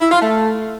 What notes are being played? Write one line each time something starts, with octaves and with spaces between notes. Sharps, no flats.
E4
F4
A3